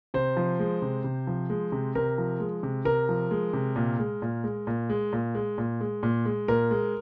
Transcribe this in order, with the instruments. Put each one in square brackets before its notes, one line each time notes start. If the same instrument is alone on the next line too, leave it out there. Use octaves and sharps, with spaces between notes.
[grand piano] C3 C5
F3
G#3
C3
C3
F3
G#3
C3
C3 A#4
F3
G#3
C3
C3 A#4
F3
G#3
C3
A#2
G#3
A#2
G#3
A#2
G#3
A#2
G#3
A#2
G#3
A#2
G#3
A#2 A#4
G#3